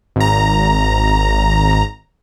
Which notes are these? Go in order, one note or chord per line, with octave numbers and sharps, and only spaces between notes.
G#1 A#5